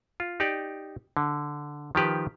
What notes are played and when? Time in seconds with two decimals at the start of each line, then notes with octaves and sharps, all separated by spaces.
0.20 F4
0.40 D#4 G4 D5
1.17 D3
1.95 D#3 F3 G4 B4